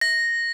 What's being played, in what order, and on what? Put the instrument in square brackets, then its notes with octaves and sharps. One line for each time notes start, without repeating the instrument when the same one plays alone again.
[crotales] A#6